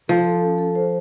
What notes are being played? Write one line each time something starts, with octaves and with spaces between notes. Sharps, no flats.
F3 A4
A4
C#4
A4
C5